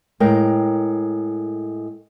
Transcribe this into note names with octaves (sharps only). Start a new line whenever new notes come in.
A2 G#3 A#4 G5